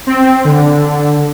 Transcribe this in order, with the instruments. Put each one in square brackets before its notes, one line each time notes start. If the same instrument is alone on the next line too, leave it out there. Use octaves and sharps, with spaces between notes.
[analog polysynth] C4
D3